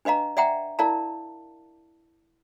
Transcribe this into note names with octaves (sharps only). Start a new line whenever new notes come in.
D4 B4 D#5 F5 A#5
D5 E5 F#5 G5 A#5
E4 A#4 D5 F5 A5